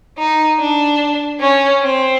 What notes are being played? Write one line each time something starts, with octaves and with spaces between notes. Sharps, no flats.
D#4
D4
C#4
C4